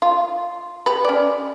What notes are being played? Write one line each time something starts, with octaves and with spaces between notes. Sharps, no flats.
F4
G4 B4
C#4 D5